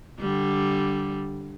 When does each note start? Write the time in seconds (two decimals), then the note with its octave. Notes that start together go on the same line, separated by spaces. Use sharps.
0.19 D3 G3